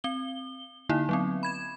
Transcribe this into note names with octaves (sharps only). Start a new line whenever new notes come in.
C4 G7
D3 A#3 D#4 E4
F#3 B3 C4
B5 G#6 E7